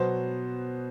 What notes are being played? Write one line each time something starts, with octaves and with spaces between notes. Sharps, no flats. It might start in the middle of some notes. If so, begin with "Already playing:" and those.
Already playing: B2 F#3 B3 C5